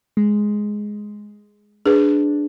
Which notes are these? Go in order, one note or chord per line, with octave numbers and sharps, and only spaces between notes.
G#3
D4 G#4 B4